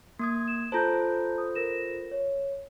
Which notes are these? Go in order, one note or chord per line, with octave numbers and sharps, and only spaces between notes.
A#3 D#6 G#6
E7
F4 A4 C5 A5 A#5 G6
D#6
A#4 A#6 E7
C#5